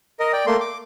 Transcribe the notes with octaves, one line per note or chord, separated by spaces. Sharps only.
A#4 D#5
D5 G5
A3 A#3 C6
D6